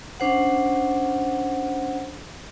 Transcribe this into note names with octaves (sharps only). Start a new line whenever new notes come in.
C#4 D4 C5 F#5